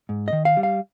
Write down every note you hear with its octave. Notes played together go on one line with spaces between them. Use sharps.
G#2
D#3 D#5
F5
G3
F5